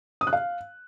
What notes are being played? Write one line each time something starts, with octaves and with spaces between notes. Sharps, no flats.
D#6
F#6
F5